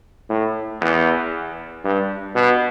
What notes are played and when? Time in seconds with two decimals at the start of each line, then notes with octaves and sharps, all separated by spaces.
0.30 A2
0.81 E2
1.85 G2
2.35 B2